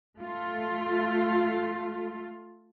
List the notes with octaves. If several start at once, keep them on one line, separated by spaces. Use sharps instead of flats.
A3 F4